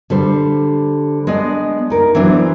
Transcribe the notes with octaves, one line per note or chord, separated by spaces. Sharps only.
D3 G3 C5
G#3 B3 D4 D5 D#5
D#4 A#4
E3 F#3 B3 D4 C5